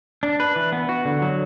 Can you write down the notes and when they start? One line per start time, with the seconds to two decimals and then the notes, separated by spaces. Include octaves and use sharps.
0.23 D4
0.40 B4
0.56 E3
0.72 B3
0.89 F#4
1.05 D3
1.22 F#3